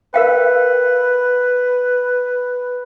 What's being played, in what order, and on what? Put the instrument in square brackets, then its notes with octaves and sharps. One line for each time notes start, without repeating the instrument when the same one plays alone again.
[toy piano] A#4 F5 G5 [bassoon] B4